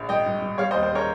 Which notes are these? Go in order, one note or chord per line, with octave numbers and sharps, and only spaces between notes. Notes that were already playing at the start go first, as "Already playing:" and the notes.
Already playing: A#1
G#1 D#5 G5
G2
G2
G3 C#5 F5
C5 D#5
D#2
C5
C#3 A#4 C#5